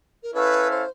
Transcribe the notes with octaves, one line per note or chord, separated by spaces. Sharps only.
A#4
C#4 E4 A4 B4 C#5 F5
C5